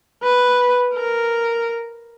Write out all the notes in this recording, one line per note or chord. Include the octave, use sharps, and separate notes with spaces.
B4
A#4